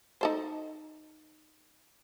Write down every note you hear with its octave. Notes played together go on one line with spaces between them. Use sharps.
D#4 A4 C5